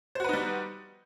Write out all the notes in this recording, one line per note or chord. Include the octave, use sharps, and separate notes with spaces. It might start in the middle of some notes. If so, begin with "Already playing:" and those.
G3 D#4 F#4 B4 C5